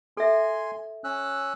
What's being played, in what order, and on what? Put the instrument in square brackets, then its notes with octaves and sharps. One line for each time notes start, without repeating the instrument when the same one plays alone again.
[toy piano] A4 E5 [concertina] G#5 C6
[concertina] C#4 E6 F#6